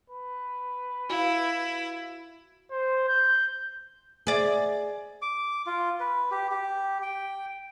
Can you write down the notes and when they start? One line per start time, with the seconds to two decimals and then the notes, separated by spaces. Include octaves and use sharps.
0.10 B4
1.10 E4 F#4 F5
2.71 C5
3.08 G6
4.27 G#4 D5
5.22 D6
5.66 F4
6.00 B4
6.31 G4
6.51 G4
7.02 G5